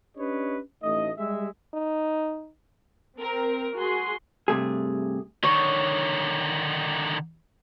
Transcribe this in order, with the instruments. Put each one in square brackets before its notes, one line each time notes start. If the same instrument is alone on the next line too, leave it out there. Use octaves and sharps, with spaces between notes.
[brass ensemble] C#4 D4 G4 B4 C#5 D#5
A1 A3 D#4 D#5
G3 G#3 E5
[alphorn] D#4
[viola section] C4 [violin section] A#4
[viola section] F#4 C6 [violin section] G#4
[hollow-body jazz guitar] G2 C3 A3 G#4
[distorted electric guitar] D3 D#3 [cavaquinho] C#5